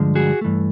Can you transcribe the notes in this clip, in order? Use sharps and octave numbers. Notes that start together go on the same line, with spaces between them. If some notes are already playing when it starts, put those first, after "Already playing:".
Already playing: G2 D3 F3 G#3
F#4 G#4
G2 E3 A3